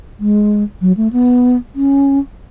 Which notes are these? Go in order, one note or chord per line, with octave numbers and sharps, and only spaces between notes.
G#3
F#3
A3
B3
C#4